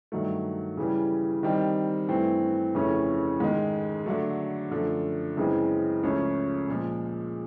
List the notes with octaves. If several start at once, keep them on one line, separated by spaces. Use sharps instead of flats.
G2 D#3 F#3 A3
C#3 E3 G3
D#3 G3 C4 D#4
G2 E3 A3 C4
F2 C#3 E3 A3 C#4
G#2 D#3 G#3
D3 F#3 A3
F#2 D3 F3 A3
F#2 C#3 E3 G#3 C4
C#2 C#3 F3 A3 C#4
A#2 F3 G#3